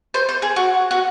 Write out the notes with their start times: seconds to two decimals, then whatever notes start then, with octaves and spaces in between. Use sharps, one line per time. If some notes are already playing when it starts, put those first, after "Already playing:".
0.14 C5
0.29 C5
0.42 G#4
0.56 F#4
0.91 F#4